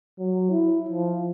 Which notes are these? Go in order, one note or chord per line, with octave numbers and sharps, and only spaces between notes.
F#3
E4
F3